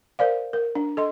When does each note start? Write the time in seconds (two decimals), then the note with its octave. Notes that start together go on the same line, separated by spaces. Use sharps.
0.19 A#4 C5 D5 F5
0.53 A#4
0.75 D4
0.97 A4 D#5 C6